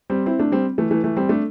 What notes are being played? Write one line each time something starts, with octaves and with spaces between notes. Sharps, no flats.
G3 C4
C4 E4
A3 D4
G3 C4
E3 A3
E3 A3
E3 A3
G3 C4
A3 D4